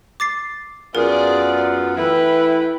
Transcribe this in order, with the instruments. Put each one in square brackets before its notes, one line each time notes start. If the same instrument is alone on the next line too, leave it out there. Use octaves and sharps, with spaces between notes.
[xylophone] D6 A6 C7
[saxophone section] F#2 B3 F4 [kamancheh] G#4 D5 [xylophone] A#4
[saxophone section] E3 A3 E4 [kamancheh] B4 G5